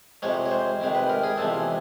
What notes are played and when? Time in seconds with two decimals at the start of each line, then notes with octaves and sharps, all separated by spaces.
0.22 F2 C3 F3 G#3 C#5
0.46 C#5
0.51 C5
0.80 F2 C3 D#3 G#3
0.95 B4
1.10 A#4
1.24 G#4
1.38 E2 C3 F3 G#3 A4